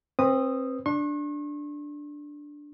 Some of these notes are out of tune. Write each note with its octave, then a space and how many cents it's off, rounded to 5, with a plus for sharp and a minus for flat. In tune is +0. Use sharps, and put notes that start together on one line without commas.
C4 +25 B4 +0 D#6 -5
D4 +0 C#6 -45